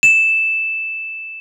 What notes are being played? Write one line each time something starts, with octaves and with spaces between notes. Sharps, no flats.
E7